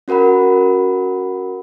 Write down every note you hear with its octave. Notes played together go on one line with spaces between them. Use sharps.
C#4 F#4 A#4 F#5 B5